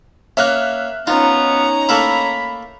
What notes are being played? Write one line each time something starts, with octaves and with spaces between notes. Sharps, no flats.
A#3 C#4 E5 F6 F#6
B3 C#4 D#4 F4 A#5
A3 A#3 E4 B5